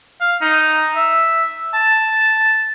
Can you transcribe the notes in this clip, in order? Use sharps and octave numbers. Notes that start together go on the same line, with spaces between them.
F5
D#4
E5
A5